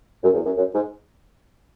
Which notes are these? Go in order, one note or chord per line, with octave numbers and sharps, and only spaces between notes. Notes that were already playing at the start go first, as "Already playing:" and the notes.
F#2
E2
F#2
F#2
G#2